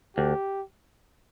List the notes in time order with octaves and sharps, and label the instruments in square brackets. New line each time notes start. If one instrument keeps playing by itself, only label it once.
[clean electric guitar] D2 [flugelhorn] G4